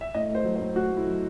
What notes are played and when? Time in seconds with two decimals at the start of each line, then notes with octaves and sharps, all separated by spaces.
0.01 E5
0.14 A2 D#5
0.29 A3
0.35 C5
0.44 F#3
0.56 C5
0.60 A2
0.76 A2 F#4
0.91 A3
0.97 E4
1.07 F#3